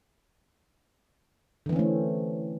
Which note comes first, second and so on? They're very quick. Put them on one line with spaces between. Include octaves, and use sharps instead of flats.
D3 E3 C4 C#4 A3